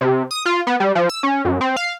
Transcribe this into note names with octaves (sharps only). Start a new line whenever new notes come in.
C3
D#6
F4
B3
G3
F3
E6
C#4
F#2
C4
F5